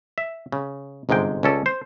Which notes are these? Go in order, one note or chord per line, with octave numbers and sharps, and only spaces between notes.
E5
C#3
G1 G#2 C3 G#3 G5
C#2 C#4 A4 D5
C5